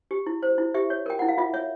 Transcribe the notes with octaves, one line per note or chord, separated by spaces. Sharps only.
G4
E4
C5
E4
G4 E5
C#5
A#4 G5
E4 F#5
F5
F4 E5
C#5 E5